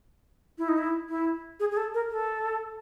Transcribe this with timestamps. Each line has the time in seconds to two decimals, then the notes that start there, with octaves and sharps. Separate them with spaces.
0.58 E4
0.69 D#4
0.78 E4
1.09 E4
1.60 G#4
1.71 G#4
1.77 A4
1.94 A#4
2.11 A4